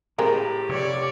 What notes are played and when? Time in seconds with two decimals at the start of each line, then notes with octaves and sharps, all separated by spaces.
0.18 A2 G#3 C4 G4 A#4
0.69 F1 C3 C#5 D5